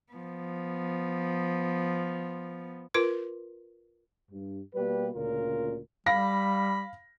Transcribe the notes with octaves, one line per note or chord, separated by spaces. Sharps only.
F3 B3
F4 A#4 B4 C6
G2
B2 G3 A#3 G4 B4
D2 A#2 C#3 C#4 F4 A#4
G3 F5 B5 A#6